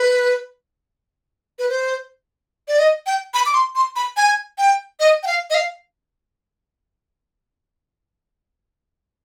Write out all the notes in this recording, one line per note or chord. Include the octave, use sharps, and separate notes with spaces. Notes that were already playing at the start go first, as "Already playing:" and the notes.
Already playing: B4
B4
C5
D5
D#5
G5
B5
D6
C6
C6
B5
G#5
G5
D#5
G5
F5
D#5
F5